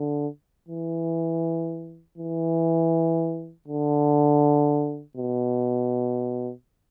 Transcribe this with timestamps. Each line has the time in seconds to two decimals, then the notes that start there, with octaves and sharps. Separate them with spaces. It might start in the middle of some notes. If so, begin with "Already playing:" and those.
Already playing: D3
0.68 E3
2.18 E3
3.68 D3
5.17 B2